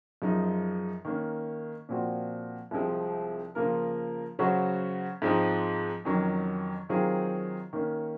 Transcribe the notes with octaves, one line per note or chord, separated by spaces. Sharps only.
F#2 F3 G#3 D#4
D#3 A#3 C#4
A#2 F3 C4 F#4
C2 C3 F3 G#3 C4
C#3 F3 A#3 F4 A#4
C#3 F#3 C#4 F#4 C5
G#2 F3 G#3 C4 D#4
F2 D#3 F#3 C#4
D#3 F#3 C4 F4 G#4
D#3 A#3 C#4